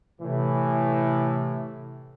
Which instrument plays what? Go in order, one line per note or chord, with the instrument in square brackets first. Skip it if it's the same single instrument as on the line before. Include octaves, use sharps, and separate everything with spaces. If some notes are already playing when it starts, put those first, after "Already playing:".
[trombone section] A2 E3 [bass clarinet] C3